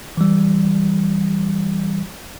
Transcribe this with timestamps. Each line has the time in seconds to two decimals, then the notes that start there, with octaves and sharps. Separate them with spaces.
0.17 E3 G3